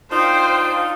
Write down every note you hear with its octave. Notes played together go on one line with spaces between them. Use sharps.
D4 D#4 F4 C5 G5